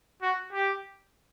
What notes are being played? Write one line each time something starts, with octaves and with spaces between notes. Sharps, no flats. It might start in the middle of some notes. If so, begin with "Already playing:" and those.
F#4
G4